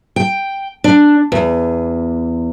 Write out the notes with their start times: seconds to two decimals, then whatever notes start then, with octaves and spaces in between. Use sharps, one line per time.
0.16 G5
0.84 D4
1.32 E2